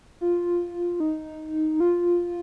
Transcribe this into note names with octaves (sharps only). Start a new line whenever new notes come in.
F4
D#4
F4